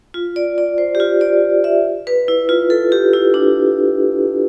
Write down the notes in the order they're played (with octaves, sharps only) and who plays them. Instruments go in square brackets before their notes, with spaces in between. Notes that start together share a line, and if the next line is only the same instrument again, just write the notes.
[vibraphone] F4
D5
D5
C5
G4
F4
D5
E5
B4
E4
F4
A4
G4
E4
D4